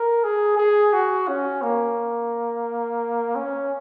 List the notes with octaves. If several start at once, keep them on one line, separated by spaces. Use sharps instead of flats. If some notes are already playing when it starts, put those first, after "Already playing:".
Already playing: A#4
G#4
G#4
F#4
C#4
A#3
C#4